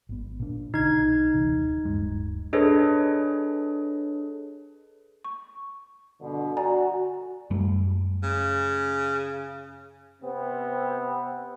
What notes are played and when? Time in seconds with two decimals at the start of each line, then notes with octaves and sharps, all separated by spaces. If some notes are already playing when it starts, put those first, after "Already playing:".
0.09 G#1 B3
0.40 A#2 D4
0.74 B1 D3 D#4 G#6
1.34 D#1 C3 E3
1.85 D1 G2 G#3
2.53 D4 G#4 A4 B4 C#5 D#5
5.25 C#6
6.21 G2 B2 D3
6.57 F#4 D5 G#5 A#5
7.50 F#2 G3 A3
8.23 C#3
10.22 C3 B3 C4